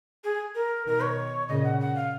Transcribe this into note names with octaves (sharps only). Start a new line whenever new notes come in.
G#4
A#4
B2 D#3 A#4
C#5
A#2 C#3 D#5
F#5
F#5
F5